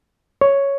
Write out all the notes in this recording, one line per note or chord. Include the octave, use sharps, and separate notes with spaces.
C#5